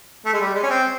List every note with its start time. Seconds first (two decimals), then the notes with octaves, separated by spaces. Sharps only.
0.25 A3
0.33 G#3
0.40 G3
0.54 G#3
0.63 C#4
0.69 C4